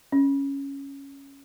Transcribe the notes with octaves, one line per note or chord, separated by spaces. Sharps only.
C#4